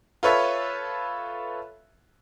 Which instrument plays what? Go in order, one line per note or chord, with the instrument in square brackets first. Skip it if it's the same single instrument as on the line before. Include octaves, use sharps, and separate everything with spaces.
[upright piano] F4 A4 B4 C#5 E5